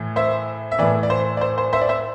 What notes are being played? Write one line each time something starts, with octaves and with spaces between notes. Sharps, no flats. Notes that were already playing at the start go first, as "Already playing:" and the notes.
Already playing: A2 E3
C5 E5
E5
A2 E3 B4 D5
D5
C5
D5
C5
C5
C5 E5
D5
C5 E5